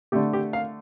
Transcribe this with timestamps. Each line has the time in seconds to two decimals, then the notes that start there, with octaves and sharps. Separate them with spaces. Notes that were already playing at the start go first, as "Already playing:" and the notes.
0.12 D3 A3 G4
0.33 G4
0.53 F5